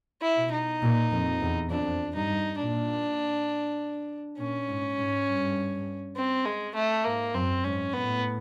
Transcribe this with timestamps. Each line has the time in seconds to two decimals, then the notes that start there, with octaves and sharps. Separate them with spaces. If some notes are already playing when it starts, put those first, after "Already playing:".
0.22 E4
0.37 B2
0.52 D#4
0.81 A#2
1.11 F2
1.41 E2
1.70 F2 D4
2.15 G2 D#4
2.59 A#2 D4
4.38 A#2 C#4
4.68 G#2
4.97 G#2
5.27 G2
6.16 C4
6.45 G#3
6.75 A3
7.04 G#2 A#3
7.34 F#2 C4
7.64 G#2 C#4
7.93 A2 B3